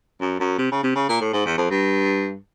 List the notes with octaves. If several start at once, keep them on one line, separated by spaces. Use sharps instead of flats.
F#2
F#2
C3
C#3
C3
C#3
A#2
A2
G#2
E2
F2
G2